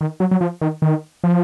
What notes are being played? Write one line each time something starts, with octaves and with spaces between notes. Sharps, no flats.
D#3
F#3
F#3
F3
D#3
D#3
F3